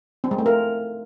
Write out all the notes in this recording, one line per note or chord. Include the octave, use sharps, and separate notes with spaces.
C4
G#3
A3
A#4